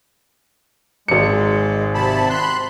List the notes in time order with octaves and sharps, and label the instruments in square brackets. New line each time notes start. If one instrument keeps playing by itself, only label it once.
[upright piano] G#1 C#7 [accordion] G#3
[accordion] C3 A5 B5
B5 C6 F#6